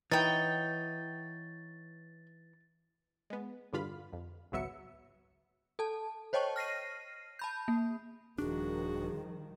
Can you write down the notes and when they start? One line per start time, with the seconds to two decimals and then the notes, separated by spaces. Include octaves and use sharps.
0.12 E3 B3 D#4 C#5 G5 A6
3.30 G#3 B3
3.73 E2 G2 D3 F4 F5 B5
4.13 F2
4.52 G#1 C#2 F#3 B3 E5 C#7
5.79 A4 A5
6.33 C5 C#5 D#5 G5 A5 C#6
6.56 F6 A#6 C7 D#7
7.39 A5 B5 G6
7.68 A#3
8.38 D#1 D#3 F3 G3 D4 F#4 G#4